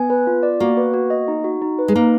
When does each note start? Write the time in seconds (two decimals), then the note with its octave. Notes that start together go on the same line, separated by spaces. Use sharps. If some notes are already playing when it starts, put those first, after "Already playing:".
Already playing: B3 G#5
0.10 B4
0.27 F4
0.43 D5
0.60 A#3 F#4
0.77 B4
0.94 F#4
1.10 D#5
1.28 D#4
1.44 F#4
1.62 D#4
1.79 B4
1.88 G#3
1.95 A#3 D#4